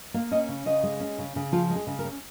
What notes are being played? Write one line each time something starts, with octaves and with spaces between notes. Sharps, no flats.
A#3 F5
C#4 D#5
C#3
C#3 D#5
G#3
C#4
C#3
C#3
F3 F4
G#3
G#4
C#3
A#4
C#4